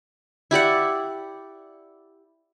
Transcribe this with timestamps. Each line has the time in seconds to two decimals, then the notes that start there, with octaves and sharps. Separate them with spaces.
0.51 E4 G4 D5 F#5